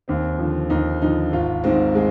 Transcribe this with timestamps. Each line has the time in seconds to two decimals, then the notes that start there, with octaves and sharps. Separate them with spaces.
0.08 D#2 C4
0.39 D3 F3
0.70 D#2 D#4
1.02 D3 F3 D#4
1.33 G#1 F4
1.64 G#2 D#3 C4
1.95 G#3